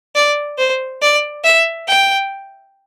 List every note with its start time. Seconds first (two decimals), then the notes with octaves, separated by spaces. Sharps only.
0.15 D5
0.58 C5
1.02 D5
1.44 E5
1.88 G5